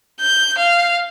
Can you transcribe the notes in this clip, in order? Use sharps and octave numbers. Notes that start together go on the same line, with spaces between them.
G6
F5